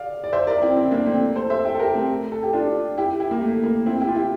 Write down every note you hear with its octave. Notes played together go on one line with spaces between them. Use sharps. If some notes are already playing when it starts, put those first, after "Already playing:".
Already playing: D5 F5
D5
C5 E5
A#4 D5
C4 E4
C4 E4
A#3 D4
A3 C4
A4 C5
C5 E5
E5 G5
A4
G4 A#4
A3 C4
A4
G4
D4 F4
E4 G4
E4 G4
A#3
A3
A#3
C4 E4
E4 G4
F4
E4 G4